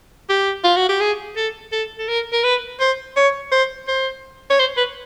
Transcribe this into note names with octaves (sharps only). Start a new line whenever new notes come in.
G4
F4
F#4
G4
G#4
A4
A4
A4
A#4
A#4
B4
C5
C#5
C5
C5
C#5
C5
B4